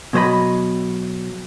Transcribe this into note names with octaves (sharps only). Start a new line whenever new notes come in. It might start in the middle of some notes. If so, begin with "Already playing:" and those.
B2 F#3 C5 D#5 B5